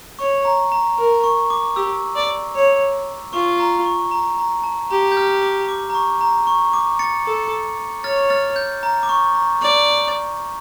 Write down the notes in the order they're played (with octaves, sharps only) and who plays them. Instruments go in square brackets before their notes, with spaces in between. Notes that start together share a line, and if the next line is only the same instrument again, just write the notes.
[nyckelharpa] C#5 [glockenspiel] C#6
[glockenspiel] A#5
A#5
[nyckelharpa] A#4
[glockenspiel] C#6
D6
[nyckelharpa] G4 [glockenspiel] E6
[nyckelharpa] D5
C#5
[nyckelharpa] F4 [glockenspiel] C#6
[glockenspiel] A#5
C#6
A#5
A#5
A5
[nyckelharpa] G4 [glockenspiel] A#5
[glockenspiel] G6
F6
D6
D6
A#5
C#6
A#5
C#6
D6
A6 C#7
[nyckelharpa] A4
[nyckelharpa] C#5 [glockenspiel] F6 A6
[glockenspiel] F6 A6
G6
A#5
D6
C#6
A#5
[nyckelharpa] D5